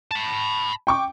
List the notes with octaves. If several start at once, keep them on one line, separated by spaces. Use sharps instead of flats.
A5 B5
G5 C#6 D6